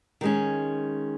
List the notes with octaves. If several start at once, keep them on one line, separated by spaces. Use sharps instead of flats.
D#3 G#3 C#4